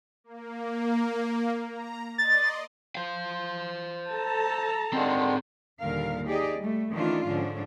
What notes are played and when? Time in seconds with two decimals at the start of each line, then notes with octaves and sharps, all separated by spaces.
0.24 A#3
1.63 A#5
2.18 D5 D#5 C6 A6
2.95 C5 F5
4.13 A4 A5 A#5
4.93 D3 D#3 G#3 C4 G#4
5.80 D#2 A#2 D3 G3 A#4 F5
6.25 D#4 G4 G#4 D5 D#5
6.57 G3 A3
6.92 D#3 E3 A3 C#4 D4 F4
7.26 G#2 D3 F3 C#4 D4